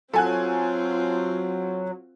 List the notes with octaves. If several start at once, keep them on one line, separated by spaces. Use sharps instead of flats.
F#3 C4 F4 A4 G#5 F#6